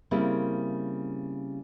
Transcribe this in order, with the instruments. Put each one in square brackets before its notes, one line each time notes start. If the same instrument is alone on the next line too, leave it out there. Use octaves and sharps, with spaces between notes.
[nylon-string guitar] C#3 G3 A#3 C4 E4